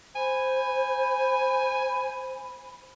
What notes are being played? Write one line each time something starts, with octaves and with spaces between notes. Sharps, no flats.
C5 G#5 B5